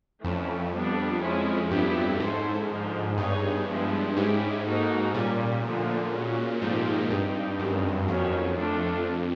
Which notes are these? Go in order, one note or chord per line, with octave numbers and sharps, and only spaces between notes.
F2 E3 A3 C#4
G3 B3 D4
F3 G#3 C#4 E4
G2 F#3 B3 E4 G4
G#2 C#4 E4 A4 C5
D3 F3 G#3
G2 B3 D#4 G#4 C#5
F3 G#3 B3 E4
G#2 G#3 C#4 E4 G4
A#3 D#4 F#4 A4
A#2 G3 A#3 C#4
D3 F3 A3
G#3 C#4 F#4
G#2 F3 A3 C4 D#4 G4
G2 C4 D#4 G4
F#2 D#3 G#3 C4
F2 D#3 F#3 A#3 C#4 F#4
A3 D4 F4 A4